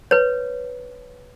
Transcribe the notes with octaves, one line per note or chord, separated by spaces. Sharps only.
B4 C#5